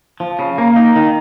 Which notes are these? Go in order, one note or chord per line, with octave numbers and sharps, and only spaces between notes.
F3
C#3
A#3
D#4
D#3